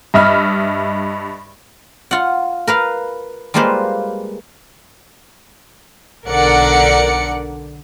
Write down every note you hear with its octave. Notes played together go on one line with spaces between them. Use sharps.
G2 D#5 E5 B5 F6
F4 F#5
A#4 B4 F5
G3 G#3 A#3 F4 B4 C5
B1 D3 A#4 D5 F#5 C#7